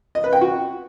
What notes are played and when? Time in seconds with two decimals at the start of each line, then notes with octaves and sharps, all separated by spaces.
0.15 D#5
0.24 B4
0.33 G5
0.41 F#4